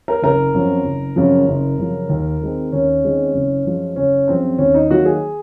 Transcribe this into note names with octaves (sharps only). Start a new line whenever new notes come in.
A#4
F#1 A#4
F#2 F3 C4
F#1
F#2 C#3 F3
F#1
F#2 C#3 F3
D#2
D#3 G#3 C4
D#2 C#4
D#3 G#3 C4
F#1
F#2 F3 G#3
F#1 C#4
F#2 F3 G#3 C4
D#2 C#4
D#4
D#3 F#3 A#3 F#4
G#4